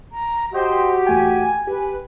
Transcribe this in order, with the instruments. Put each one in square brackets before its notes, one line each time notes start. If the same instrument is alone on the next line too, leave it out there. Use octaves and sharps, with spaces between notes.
[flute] A#5
[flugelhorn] F#4 [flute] G4 [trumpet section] C5 D#5 G5
[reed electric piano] E2 A3 G5 [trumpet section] G#5
[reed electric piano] G4 [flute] B4